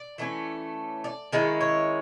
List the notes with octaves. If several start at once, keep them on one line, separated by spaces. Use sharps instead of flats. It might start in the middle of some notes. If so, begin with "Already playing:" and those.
Already playing: D5
E3 A3 C#4
D5
D#3 G#3 C#4 E4
C#5